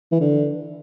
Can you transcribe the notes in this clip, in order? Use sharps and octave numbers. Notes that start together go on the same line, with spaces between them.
E3
D3